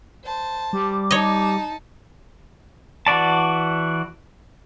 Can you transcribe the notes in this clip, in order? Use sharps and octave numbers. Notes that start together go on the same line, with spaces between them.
C5 A5
G3 D6
D#4 C#5 D#5 A5
E3 F#4 D5 A5